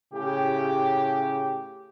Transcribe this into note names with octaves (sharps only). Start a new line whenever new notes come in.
A2 C#3 G4